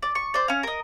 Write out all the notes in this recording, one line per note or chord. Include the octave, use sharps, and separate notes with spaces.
D5
C#6
C5 D5
C#4 F5
A#4 D#5